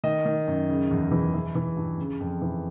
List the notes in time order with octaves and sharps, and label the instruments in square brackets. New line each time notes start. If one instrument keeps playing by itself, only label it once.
[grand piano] D#3 D#5
D#3
F#2
C#3
E2
E3
E3
E3
G2
C#3
F2
E3